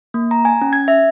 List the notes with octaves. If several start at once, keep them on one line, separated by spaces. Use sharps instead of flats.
A#3
A#5
G#5
C#4
G#6
E5